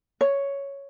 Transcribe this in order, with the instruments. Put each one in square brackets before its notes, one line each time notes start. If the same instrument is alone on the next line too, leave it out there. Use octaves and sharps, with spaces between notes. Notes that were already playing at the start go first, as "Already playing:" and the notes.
[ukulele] C#5